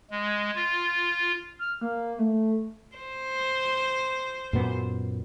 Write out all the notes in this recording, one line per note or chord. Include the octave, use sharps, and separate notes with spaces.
G#3
F4
F6
A#3
A3
C5
F#2 A#2 B3